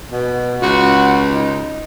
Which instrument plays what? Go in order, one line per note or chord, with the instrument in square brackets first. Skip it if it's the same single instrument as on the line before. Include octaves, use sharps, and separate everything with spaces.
[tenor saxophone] B2
[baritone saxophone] C#2 [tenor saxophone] F#4
[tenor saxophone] D#4